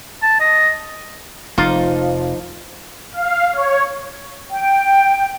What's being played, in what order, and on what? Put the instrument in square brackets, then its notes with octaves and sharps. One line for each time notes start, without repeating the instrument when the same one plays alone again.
[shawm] A5
D#5
[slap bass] F1 [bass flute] F3 [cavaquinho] D#4 D6 [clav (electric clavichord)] F4
[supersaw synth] F5
C#5
[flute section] G5